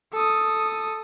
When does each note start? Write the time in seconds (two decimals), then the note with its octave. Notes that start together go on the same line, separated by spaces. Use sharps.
0.13 A4 D#6